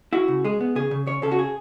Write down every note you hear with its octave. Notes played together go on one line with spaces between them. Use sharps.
E4 F#4
C#3
G#3 G#4
B3
C#3 G#4
C#3
C#3 C#5
C#3 A4
F#4
G#4